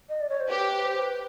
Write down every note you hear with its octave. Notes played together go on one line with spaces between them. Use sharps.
D#5
D5
C#5
C5
G4 B4
C5
B4